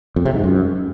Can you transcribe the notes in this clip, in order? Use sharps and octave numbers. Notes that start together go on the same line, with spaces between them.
F2
C3
G#2
F#2